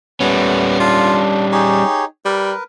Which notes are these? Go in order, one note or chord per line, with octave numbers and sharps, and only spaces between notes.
G3 A3 B3 C#4
D4 F4
D#4 G4 G#4 C#5
G3 A#4 B4